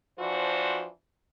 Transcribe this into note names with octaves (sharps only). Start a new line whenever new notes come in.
E3 F3 D4 F#4 C5